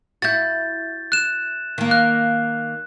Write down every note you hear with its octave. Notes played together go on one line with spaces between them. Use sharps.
E4 F#4 G6 A6
F#6 E7
D#3 A#3
F#6